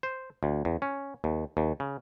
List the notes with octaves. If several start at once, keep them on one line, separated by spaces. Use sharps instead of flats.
C5
D2
E2
C#4
D#2
D#2
C#3